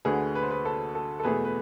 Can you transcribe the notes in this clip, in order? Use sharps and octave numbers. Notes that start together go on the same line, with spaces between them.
D2 D3 A3 G#4 B4
B4
C5
G#4 B4
A4
A4
A4
E2 B2 A3 G#4 B4
B4